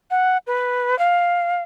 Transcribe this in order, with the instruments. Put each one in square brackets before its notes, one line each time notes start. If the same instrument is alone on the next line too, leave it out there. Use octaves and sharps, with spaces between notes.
[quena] F#5
B4
F5